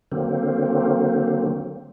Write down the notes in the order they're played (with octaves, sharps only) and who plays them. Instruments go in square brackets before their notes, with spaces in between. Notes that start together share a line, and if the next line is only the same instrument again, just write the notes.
[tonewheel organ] D3 F#3 A#3 C4